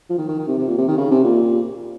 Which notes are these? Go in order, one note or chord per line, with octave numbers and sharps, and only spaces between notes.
F3
D#3
D#3
D#3
C3
C3
A#2
C3
D#3
C#3
C3
A#2